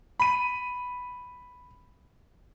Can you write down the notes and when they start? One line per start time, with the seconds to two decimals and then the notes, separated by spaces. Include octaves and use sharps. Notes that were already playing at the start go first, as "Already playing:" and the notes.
0.20 B5 D#7